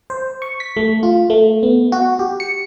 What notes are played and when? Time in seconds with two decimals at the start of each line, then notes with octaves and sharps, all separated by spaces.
0.10 C5
0.42 C#6
0.60 B6
0.77 A3
1.03 F4
1.30 A3
1.63 B3
1.92 F#4
2.19 G4
2.40 C#7